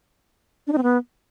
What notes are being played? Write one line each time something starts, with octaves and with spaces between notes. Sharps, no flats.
D4
D#4
C4
B3